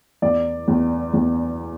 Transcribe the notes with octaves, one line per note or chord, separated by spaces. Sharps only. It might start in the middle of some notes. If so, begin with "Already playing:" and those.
E2 D5
E2
E2